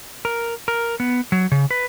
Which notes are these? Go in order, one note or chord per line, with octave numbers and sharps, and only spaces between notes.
A#4
A#4
B3
F#3
C#3
B4